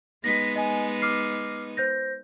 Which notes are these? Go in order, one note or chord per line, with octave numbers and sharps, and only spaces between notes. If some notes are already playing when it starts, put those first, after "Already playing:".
G#3 B3 D#4 A#6 B6
D#5 G#5
D6 F6 C7
C5 G6 A#6